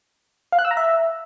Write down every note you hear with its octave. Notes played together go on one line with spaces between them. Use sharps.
F5
F#6
E6
A#5
E5